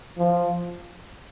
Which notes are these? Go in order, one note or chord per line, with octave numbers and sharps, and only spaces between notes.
F3